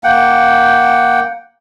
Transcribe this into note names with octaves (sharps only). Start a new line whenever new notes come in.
A#3 F#5 G5